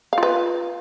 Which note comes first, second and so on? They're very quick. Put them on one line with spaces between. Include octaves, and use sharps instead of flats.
F5 F4 B4